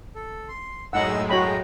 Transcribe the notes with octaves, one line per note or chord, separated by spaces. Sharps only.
A4
C6
F#2 A2 G#3 D#4 F#5 E6
F#4 C#5 G5 A#5 B5